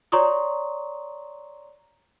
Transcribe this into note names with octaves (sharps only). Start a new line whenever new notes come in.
C#5 D5 A#5 C6 C#6 D#6